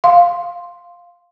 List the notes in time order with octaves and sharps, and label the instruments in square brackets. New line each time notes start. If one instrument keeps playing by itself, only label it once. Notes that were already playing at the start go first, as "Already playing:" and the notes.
[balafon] F5 C6